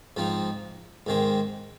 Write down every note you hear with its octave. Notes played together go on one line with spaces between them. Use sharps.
G#2 F3 C4 D#4
G#2 D#3 G#3 C4